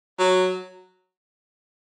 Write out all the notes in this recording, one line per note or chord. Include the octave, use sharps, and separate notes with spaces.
F#3